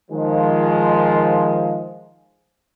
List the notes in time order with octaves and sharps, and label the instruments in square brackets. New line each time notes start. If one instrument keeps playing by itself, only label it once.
[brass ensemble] D#3 F3 G#3